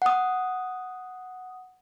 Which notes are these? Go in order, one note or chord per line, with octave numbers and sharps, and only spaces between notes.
F#5 D#6